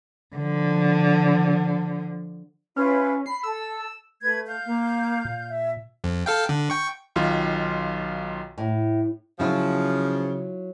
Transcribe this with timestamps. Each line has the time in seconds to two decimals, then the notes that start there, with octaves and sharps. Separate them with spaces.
0.36 D3 F3
2.76 C#4 E4 F4 B4
3.26 B5 C7
3.43 A4 E6
4.22 A3 B4 G#6
4.46 F5 G6
4.67 A#3
5.25 A#2
5.50 E5
6.04 F2
6.26 A4 F5 G5
6.49 D3
6.70 G5 C#6
7.16 B1 D#3 F4
8.58 A2
9.40 C#3 F3 F#3 E4 F4